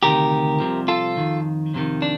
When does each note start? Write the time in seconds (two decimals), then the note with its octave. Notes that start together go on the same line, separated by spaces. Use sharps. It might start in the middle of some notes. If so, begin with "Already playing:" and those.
0.03 D2 C3 D#3 G4 A#4
0.60 C2 C3 F3
0.88 F4 A4
1.17 F2 D#3
1.74 F2 C3 D#3
2.02 D4